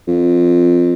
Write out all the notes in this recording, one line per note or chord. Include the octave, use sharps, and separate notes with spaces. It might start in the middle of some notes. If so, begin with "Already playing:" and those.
F2